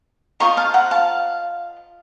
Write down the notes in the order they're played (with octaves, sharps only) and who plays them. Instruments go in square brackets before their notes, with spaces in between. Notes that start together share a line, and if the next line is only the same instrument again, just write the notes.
[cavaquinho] F4 C5 D#5 A#5 C#6
F5 A5
F#5 A#5
F5 A5